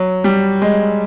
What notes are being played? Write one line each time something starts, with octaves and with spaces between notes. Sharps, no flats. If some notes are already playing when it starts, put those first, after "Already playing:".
Already playing: F#3
G3
G#3